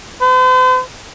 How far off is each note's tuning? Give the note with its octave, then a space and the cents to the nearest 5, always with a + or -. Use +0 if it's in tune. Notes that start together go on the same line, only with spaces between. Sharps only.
C5 -45